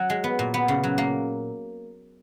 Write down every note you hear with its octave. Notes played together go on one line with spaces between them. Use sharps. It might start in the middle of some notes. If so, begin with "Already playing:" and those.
Already playing: F#3 F#4
G#3
B3
A#2
B3
C#3
F#3
A#3